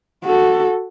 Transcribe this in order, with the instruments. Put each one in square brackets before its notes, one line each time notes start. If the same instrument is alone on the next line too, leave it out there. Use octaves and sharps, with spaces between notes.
[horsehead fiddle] F#4 A4